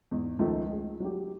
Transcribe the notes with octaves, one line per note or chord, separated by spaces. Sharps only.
E2 G#2
C#2 D#3 F3 A3
G#4
F#3 G4